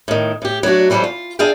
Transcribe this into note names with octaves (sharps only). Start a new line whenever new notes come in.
A2 D#3
A2 G4
F#3 A3 D4 F#4
E3 F#3 G3 G4 A4 C5
F4
D4 F4 G#4 E5 F5 G5